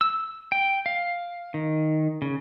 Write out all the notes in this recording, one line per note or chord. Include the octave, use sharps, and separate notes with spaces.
E6
G5
F5
D#3
C#3